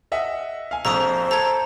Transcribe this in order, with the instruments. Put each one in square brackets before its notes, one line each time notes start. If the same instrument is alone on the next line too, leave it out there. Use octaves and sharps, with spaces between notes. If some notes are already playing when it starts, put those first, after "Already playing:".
[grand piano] D#5 E5 F#5
F5 G#5
[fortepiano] A#1 F2 [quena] C5 [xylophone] A#5 C#6 D#6 [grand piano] E6 F7
[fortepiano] A4 [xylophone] A#5 G#6